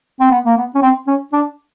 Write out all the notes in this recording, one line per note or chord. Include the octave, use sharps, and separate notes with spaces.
C4
B3
A#3
B3
C#4
C4
C#4
D4